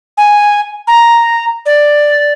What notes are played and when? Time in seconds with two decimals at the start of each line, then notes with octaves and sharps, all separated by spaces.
0.17 G#5
0.87 A#5
1.66 D5